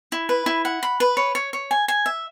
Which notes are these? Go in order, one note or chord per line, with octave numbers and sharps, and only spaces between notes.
E4
B4
E4
F#5
B5
B4
C#5
C#5
C#5
G#5
G#5
E5